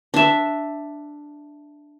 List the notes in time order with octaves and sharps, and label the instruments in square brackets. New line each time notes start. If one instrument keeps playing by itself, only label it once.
[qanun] D4 E5